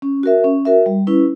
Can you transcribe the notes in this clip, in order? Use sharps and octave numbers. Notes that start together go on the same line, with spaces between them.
C#4
F#4 A#4 E5
C#4
F#4 A#4 E5
G3
C#4 E4 B4